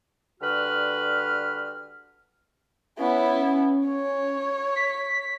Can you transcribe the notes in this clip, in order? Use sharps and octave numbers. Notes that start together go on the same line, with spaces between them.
D3 G3 F#4 B4 F6
B3 C#4 E4
C#5
B6